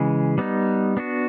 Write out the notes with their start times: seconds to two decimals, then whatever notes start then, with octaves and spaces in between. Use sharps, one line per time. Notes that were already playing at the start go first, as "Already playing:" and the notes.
Already playing: C#3 E3 G#3
0.38 G3 B3 D#4
0.97 B3 D4 F#4